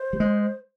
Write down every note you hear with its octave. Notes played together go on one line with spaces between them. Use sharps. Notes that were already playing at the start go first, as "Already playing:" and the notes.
Already playing: C5
G3
G#3